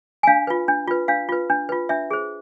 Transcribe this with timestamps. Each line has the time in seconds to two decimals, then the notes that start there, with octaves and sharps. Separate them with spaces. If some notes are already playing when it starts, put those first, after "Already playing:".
0.23 G#5
0.27 D4 F5
0.47 F4 B4
0.68 D4
0.88 F4 B4
1.08 D4 F5
1.29 F4 B4
1.50 D4
1.69 F4 B4
1.89 D4 E5
2.11 G#4 C5